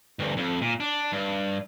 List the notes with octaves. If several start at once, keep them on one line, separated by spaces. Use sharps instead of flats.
D2 G2
F2
A#2
D4
G2